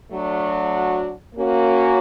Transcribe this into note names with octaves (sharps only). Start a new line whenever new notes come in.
F#3 A3 D4 F#4
A#3 C#4 F#4